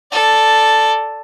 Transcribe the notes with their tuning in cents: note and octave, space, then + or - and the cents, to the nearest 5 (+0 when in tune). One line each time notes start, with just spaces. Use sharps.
A4 +0 D5 +0